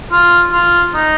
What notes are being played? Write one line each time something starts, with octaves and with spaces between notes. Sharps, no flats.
F4
F4
D#4